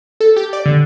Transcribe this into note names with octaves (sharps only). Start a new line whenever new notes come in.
A4
G4
D5
D3